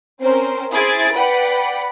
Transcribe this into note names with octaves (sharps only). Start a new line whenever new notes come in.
C4 C#4 A#4 C5
E4 G#4 C5 G#6 A6 D7
B4 D5 F#5 G5 B5